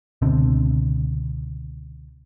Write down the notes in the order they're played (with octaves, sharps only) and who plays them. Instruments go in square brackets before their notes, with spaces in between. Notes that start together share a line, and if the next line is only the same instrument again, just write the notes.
[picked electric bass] C#2 B2 D3 C4